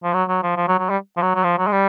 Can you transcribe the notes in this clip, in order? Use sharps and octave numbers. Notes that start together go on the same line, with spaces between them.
F3
F#3
F#3
F3
F3
F#3
F#3
G3
F3
F#3
F#3
F3
F#3
G#3
G3